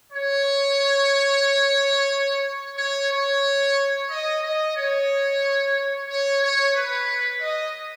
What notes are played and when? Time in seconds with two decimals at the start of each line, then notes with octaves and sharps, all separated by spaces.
0.12 C#5
2.77 C#5
3.10 C#5
4.09 D#5
4.42 D#5
4.76 C#5
6.08 C#5
6.41 C#5
6.74 B4
7.40 D#5